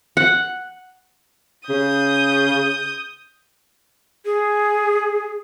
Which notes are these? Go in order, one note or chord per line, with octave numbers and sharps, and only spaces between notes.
F#5
C#3 D#6 G6
G#4